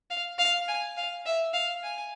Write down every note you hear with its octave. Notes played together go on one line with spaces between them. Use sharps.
F5
F5
G#5
F5
E5
F5
G#5